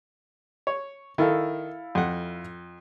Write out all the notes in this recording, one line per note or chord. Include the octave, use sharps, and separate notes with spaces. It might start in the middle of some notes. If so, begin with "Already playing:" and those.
C#5
D#3 E4 A4 F5
F2 F#5